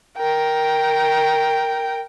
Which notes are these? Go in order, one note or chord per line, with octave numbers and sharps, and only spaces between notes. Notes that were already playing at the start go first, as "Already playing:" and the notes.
A#4 G5